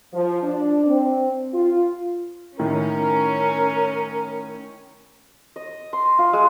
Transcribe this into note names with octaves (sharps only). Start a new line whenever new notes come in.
F3
D4
C4
F4
A2 D#3 C#4 A#4
D#5
C6
F4
G#3